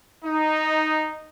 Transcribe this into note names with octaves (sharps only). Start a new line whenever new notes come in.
D#4